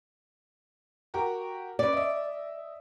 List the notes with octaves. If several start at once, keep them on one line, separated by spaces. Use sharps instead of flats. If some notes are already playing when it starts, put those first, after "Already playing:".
F#4 G4 A#4
C#4 B4 D5
D#5 E5